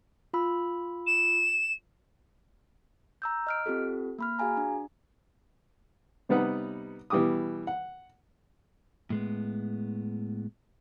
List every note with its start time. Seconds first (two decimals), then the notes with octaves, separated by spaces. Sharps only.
0.34 F4 B5 E6
1.07 E7
3.22 A#5 E6 G6
3.47 D#5 F6 D7
3.66 C4 F4 G4 A4
4.19 A#3 B5 F6
4.39 F#4 G#4 F5 G#5 A#5
4.57 D4
6.29 C3 G3 B3 D#4 B4 F#5
7.10 B2 E3 G3 G4 D6 D#6
7.67 F#5
9.10 A2 G#3 B3